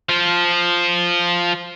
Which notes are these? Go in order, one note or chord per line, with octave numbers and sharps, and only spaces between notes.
F3 F4